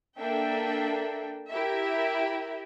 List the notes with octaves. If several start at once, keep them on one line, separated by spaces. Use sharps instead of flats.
A#3 D4 A4 E5 G5
E4 G4 A#4 E5